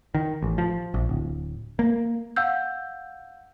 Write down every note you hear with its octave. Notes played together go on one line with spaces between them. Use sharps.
D#3
A1
F3
A#1
D1
A#3
F5 F#5 E6 G6